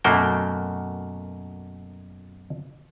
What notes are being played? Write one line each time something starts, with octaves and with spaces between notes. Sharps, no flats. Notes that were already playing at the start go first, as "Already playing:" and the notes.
F#2 B2 A3 A#3 F#4 G5